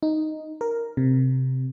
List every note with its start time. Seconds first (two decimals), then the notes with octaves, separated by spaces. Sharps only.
0.03 D#4
0.61 A#4
0.97 C3